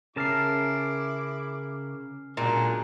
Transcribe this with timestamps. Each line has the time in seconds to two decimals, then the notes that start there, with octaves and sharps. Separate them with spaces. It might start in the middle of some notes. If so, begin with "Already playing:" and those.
0.16 C#3 C#4 E4 A#4 A5 D6 F6 C7
2.37 A#2 D3 F#3 G#3